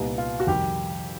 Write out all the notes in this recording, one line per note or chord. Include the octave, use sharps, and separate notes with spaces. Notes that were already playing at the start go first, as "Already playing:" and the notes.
Already playing: C2 A#2 G3 B3 D#4
F4
F#4
F2 C3 D#3 G3 G4